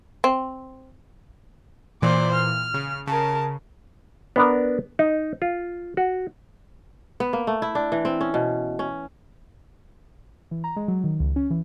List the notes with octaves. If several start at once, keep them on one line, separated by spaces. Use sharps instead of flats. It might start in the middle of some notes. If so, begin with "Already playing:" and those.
C4
A#2 E3 C5 D5
F6
C#3
C#3 A#4 A5
B3 D4 A#4
D#4
F4
F#4
B3
A#3
A3
E4
D4
E3
C4
C#4
B2
C#4
E3
A#5
G#3
F#3
D#3
C#2
C#4
E3